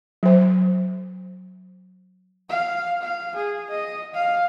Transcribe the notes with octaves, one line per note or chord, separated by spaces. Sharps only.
F#3 C5
F5
F5
G#4
D#5
F5